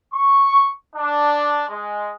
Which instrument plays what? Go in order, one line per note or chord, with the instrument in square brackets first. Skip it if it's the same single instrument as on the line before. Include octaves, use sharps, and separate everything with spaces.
[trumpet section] C#6
D4
G#3